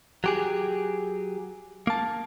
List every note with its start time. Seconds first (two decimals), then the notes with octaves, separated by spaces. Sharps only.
0.24 F#3 G4 G#4
1.87 A#3 A5